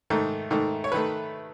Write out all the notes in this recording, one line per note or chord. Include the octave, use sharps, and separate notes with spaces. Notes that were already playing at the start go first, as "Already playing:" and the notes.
G#2 D#3 A3
G#2 D#3 A3
C#5
D#3 A3 B4